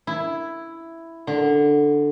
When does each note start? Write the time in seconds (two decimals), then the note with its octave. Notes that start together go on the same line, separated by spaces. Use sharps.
0.07 E4
1.27 D3